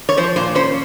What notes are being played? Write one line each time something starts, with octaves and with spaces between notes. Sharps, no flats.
C#5
F3 C5
A#2 C5
C#4 C5